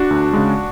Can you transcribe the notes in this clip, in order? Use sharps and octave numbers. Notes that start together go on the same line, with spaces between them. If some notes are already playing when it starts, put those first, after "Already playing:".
Already playing: D4 F#4
D2
C#3 G#3